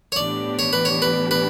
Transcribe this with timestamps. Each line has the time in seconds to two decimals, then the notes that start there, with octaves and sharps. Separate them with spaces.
0.12 C#5
0.16 A2 E3 B3 D4 G4 D5
0.59 C#5
0.73 B4
0.85 C#5
1.02 B4
1.31 B4